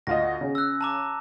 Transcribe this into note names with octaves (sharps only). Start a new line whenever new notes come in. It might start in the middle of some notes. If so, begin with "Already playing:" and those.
D2 F4 D#5 A#6
C#3
E6 F#6
A5 A#5 D6